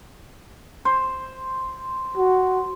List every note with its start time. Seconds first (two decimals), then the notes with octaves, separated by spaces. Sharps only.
0.85 C5
2.17 F#4